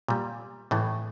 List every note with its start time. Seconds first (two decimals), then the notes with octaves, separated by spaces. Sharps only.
0.08 A#2 G3
0.71 A2 E3 A3